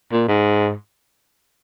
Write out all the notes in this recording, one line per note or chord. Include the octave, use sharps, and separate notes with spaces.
A#2
G#2